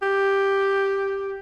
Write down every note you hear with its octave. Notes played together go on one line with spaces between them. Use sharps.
G4